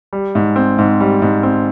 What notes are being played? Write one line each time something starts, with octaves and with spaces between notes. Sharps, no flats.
G3
G#2
C4
G#2
G3
G#2
C4